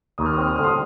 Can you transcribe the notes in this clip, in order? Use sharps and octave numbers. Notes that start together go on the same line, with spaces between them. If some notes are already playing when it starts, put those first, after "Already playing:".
D#2 D#6
F6
D#6
C4 F6
D#6
F6
D3
C6 D#6